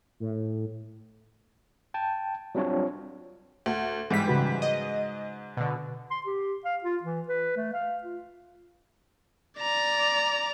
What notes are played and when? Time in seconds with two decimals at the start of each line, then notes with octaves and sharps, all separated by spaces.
0.20 A2
1.94 G5 A5
2.55 F#3 G3 C4 D4 F4 C#5
3.66 D2
4.10 G#2 E3 G3 B6
4.28 C#3 F#4 B4
4.62 D#5
5.57 B2 D3
6.11 C6
6.26 G4
6.65 F5
6.84 F4
7.03 E3
7.28 B4
7.57 A3
7.73 F5
8.03 F4
9.59 D5 A#5